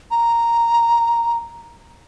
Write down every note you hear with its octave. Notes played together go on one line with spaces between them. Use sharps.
A#5